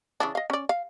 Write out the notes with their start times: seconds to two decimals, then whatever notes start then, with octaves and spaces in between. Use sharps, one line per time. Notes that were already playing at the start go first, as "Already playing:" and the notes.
0.20 C#3 E3 D4
0.35 D#5 F5
0.50 C#4 D5
0.69 F5